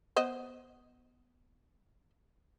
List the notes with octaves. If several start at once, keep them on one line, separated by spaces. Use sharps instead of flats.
B3 C5 D#5